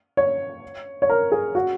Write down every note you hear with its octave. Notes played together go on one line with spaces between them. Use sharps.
C#5
C#5
A#4
G#4
F#4